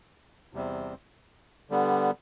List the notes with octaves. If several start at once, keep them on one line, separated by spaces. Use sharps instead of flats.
E2 C3 G3 C4
D3 G3 B3